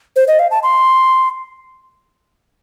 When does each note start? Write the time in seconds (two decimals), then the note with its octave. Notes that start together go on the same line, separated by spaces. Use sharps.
0.16 C5
0.28 D#5
0.39 F5
0.51 A5
0.63 C6